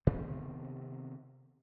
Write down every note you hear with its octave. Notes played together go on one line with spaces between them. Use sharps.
C3 D#3 B3 C4